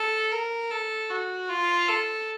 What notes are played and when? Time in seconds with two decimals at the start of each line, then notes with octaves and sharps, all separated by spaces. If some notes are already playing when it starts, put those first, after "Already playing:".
Already playing: A4
0.32 A#4
0.71 A4
1.10 F#4
1.49 F4
1.88 A4